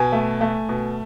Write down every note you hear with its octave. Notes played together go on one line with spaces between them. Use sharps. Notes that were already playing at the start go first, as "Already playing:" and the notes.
Already playing: B2 G#5
A3
A3
B2